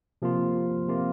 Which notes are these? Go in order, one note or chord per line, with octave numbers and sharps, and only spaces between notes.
C3 F3 A#3 F4
C3 F3 A#3 F4